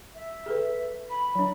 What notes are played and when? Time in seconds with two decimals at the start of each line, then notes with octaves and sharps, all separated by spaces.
0.15 E5
0.46 G#4 A4 B4
1.10 B5
1.35 F#3 D4